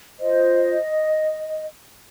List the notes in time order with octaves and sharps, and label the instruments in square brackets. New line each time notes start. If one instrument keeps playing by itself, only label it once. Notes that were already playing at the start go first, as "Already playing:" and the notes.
[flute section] F4 C5 D#5